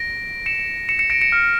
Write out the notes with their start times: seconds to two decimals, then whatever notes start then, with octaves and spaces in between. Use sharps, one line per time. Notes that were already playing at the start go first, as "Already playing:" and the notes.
Already playing: A#6 D7
0.46 C#7 E7
0.89 C#7 E7
0.99 C#7 E7
1.10 A#6 D7
1.21 C#7 E7
1.32 F6